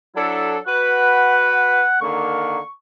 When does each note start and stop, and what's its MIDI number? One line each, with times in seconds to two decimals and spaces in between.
0.16 0.56 54
0.16 0.56 62
0.16 0.50 64
0.16 0.56 69
0.67 1.83 66
0.67 1.83 71
0.67 2.00 78
2.01 2.57 50
2.01 2.57 51
2.01 2.57 58
2.01 2.68 85